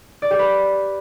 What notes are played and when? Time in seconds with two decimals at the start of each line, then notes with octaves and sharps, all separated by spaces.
0.22 D5
0.31 G4
0.39 B4